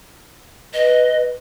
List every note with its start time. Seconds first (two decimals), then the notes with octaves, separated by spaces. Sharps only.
0.73 B4 D#5